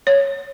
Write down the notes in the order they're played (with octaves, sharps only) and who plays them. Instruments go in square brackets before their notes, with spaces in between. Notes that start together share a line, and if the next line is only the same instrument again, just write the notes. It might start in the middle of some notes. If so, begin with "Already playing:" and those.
[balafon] C#5